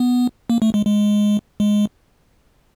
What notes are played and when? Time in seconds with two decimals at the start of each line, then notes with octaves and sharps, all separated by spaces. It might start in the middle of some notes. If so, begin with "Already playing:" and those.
Already playing: B3
0.50 A#3
0.62 A3
0.74 G#3
0.86 G#3
1.60 G#3